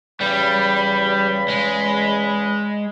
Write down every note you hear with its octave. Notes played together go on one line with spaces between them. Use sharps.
E2 C#3 G3 B5
G#3